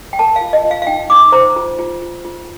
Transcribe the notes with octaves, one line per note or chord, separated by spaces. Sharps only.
G5
A#4 A5
F5
F4
D#5
F4
F5
F5
D#4 G5
D#4 D6
C5 A#5
F4
F4
F4
F4